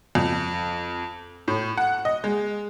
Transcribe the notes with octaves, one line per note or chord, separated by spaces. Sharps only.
F2
A2
F#5
D#5
G#3